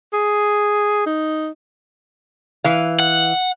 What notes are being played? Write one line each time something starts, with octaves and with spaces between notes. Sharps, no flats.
G#4
D#4
E3 F5
F#5